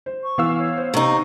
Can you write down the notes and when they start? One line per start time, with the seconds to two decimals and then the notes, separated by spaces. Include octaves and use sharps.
0.06 C5
0.24 C#6
0.38 E3 B3 F5 E6
0.59 C#5
0.78 C5
0.94 C3 D#4 C#6